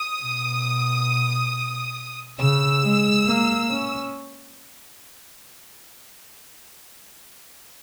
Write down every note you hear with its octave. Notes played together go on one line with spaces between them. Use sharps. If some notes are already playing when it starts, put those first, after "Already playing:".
Already playing: D#6
B2
C#3 E6
G#3
A#3
C#4